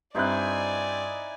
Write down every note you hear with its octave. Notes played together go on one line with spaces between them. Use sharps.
G2 C4 D#4 E4 C5 D5 G#5 F#6